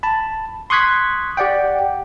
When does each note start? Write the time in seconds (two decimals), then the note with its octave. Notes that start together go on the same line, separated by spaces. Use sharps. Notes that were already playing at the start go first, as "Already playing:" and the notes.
0.03 A5 B5
0.70 C6 C#6 D#6 F#6 G#6 B6
1.37 G4 D5 F#5 G5